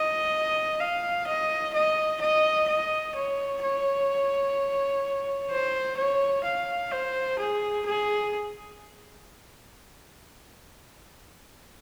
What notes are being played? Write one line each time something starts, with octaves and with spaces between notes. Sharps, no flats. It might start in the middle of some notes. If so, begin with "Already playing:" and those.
Already playing: D#5
F5
D#5
D#5
D#5
D#5
C#5
C#5
C5
C#5
F5
C5
G#4
G#4